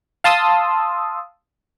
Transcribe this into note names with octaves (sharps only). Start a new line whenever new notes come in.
F5 A5 C6 D#6 E6